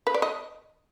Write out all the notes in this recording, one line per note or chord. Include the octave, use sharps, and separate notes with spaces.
B4
D5
D#5